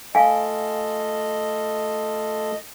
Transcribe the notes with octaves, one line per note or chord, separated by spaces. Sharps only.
A3 F4 A4 D#5 F5 G#5